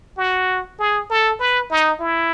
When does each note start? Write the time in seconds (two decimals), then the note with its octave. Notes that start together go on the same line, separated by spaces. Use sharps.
0.17 F#4
0.79 G#4
1.10 A4
1.40 B4
1.71 D#4
2.00 E4